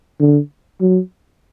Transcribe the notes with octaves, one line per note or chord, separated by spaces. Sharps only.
D3
F#3